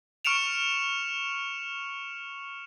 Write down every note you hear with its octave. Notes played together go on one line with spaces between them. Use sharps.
C#6 F6 C#7 D7 E7 F7